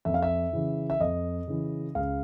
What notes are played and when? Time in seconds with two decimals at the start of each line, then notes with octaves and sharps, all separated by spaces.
0.05 F2 E5
0.14 F5
0.22 E5
0.53 C#3 E3
0.90 E5
1.00 F2 D#5
1.48 C#3 E3
1.95 C#2 F5